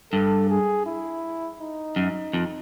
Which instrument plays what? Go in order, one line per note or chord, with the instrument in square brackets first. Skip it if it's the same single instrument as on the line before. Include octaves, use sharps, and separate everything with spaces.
[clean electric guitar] G2 [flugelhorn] A4
[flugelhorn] G#4
E4
D#4
[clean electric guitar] F#2
F2